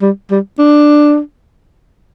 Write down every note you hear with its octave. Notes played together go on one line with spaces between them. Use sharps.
G3
G3
D4